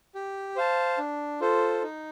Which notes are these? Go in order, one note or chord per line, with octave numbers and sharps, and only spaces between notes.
G4
C5 F5 A5
D4
F4 A4 C5
D#4